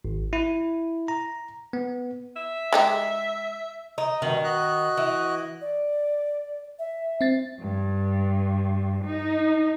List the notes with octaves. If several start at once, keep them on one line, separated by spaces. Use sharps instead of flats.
G#1
E4
A#5
B3
E5
G#3 D#4 G4
D#4
G2 B2 D#3
F#4 D#5 F#6
E3
D5
E5
C4 A6
G2
D#4